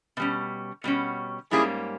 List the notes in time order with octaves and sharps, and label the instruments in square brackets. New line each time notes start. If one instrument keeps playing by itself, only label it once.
[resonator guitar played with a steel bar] B2 G3 C#4
B2 G3 C#4
[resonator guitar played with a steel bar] G#2 G3 A#3 C#4 G4 [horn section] E4 G#4